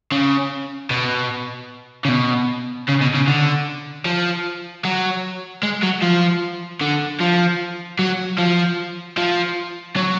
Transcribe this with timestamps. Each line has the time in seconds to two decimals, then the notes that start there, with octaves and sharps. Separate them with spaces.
0.12 C#3
0.91 B2
2.05 C#3
2.09 B2
2.88 C#3
3.01 B2
3.14 C#3
3.27 D3
4.06 F3
4.85 F#3
5.63 G#3
5.83 F#3
6.02 F3
6.81 D3
7.20 F3
7.99 F#3
8.39 F3
9.18 F3
9.96 F#3